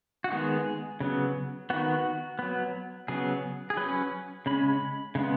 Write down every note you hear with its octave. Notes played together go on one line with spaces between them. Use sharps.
F#4
D#3 G#3 B3 G#4
C#3 F#3 B3
D#3 B3 F#4
F#3 B3
C#3 F#3 B3 G#4
G#4
F#3 C#4 B4
C#3 G#3 C#4 B5
C#3 G#3 B3